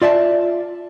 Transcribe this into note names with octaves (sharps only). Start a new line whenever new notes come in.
F4 D5 E5 A5